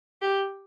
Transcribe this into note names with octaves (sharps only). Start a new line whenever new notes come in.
G4